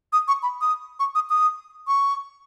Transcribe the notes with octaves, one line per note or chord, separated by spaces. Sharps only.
D#6
C#6
B5
D#6
C#6
D#6
D#6
C#6